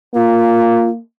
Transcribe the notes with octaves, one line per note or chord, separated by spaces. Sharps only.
A#3 F4